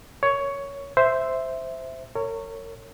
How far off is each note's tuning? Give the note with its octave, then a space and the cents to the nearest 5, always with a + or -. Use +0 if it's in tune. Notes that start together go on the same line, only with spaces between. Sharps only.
A#4 +0 C#5 +10
C5 -5 E5 +0
A#4 -35 C#5 +0